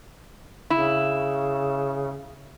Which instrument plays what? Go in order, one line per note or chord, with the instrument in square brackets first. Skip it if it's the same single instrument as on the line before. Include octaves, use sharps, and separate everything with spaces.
[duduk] C#3 [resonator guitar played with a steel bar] E4